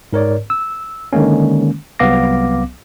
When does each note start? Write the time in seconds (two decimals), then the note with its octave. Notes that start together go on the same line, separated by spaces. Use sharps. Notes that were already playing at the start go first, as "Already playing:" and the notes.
0.13 G#2 A#4 C#5 D5
0.50 E6
1.13 D3 D#3 G#3 A#3 C#4
1.99 C2 F#3 B3 F5 D6 A#6